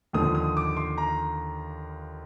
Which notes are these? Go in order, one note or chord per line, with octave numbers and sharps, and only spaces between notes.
D#2 D3 F3 D#6
D#6
D6
C6
A#5